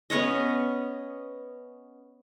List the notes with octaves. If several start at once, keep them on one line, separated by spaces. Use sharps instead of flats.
B3 C#4 C#5 D#5